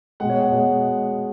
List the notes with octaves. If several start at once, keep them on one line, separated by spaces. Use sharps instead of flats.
B2 G#3 F#5
C#5
F#5
B2 G#3